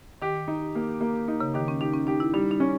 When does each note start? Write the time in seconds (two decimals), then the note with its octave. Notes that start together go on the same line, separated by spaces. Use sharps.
0.22 D#3 G4
0.48 D#4
0.75 A#3
1.01 A#3
1.28 D#4
1.40 C#3
1.54 D#3 G4
1.68 C#4
1.81 D#4 G4
1.94 C#4
2.07 D#4 G4
2.20 E4
2.33 G3 D#4
2.51 D#4
2.60 C#4